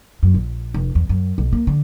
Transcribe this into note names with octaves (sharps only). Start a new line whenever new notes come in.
F#2
A#1
F1
E2
F#2
B1
A#3
D3